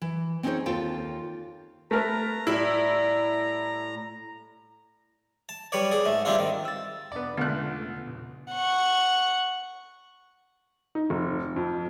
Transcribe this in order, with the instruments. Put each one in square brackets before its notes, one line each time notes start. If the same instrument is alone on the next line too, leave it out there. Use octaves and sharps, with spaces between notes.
[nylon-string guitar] E3
C4 C#4 D#4 G#4 C5 C#5
D#2 F4 A4 C#5 F5 G5
[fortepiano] A3 A#4 B4 [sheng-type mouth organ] A#5
[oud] A2 G3 [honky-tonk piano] E4
[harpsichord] A5
G3 B4 C#5 D5
G#4 D5
G#2 A3
G3 C4 D4 E4 F4
D#3
[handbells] E6 A6
[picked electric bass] E1 D4 [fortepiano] B3 D5
[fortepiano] C#2 F#6 [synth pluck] D3 A3 [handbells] B3
[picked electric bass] G2 A#2 C#3
[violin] F#5 C#6
[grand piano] D#4
F1
F2